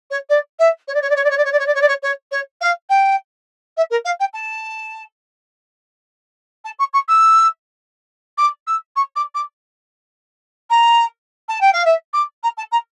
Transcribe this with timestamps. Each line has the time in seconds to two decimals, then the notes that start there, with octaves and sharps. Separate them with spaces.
0.10 C#5
0.29 D5
0.59 E5
0.87 C#5
0.94 D5
1.01 C#5
1.09 D5
1.15 C#5
1.24 D5
1.30 C#5
1.37 D5
1.44 C#5
1.52 D5
1.59 C#5
1.66 D5
1.74 C#5
1.81 D5
1.88 C#5
2.02 C#5
2.31 C#5
2.61 F5
2.89 G5
3.76 E5
3.90 A#4
4.04 F5
4.19 G5
4.33 A5
6.64 A5
6.78 C#6
6.93 C#6
7.08 E6
8.37 D6
8.67 E6
8.96 C#6
9.15 D6
9.34 D6
10.69 A#5
11.48 A5
11.60 G5
11.72 F5
11.85 E5
12.13 D6
12.43 A#5
12.57 A5
12.71 A#5